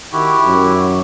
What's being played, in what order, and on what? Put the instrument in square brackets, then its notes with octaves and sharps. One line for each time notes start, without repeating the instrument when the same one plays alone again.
[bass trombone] D#3 [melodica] E4 F#4 G4
[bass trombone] F#2